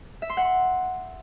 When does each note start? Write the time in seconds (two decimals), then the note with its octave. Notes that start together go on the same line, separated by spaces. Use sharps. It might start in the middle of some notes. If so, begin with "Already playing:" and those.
0.22 E5
0.30 C6
0.37 F#5
0.45 C6